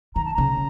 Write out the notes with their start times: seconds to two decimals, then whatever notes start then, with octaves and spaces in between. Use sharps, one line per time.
0.15 D#3 A#5
0.25 A5
0.33 C#3 A#5